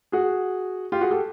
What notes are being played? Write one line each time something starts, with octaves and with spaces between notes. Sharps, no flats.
F#4 G#4
F4 G4
F#4 G#4
G4 A4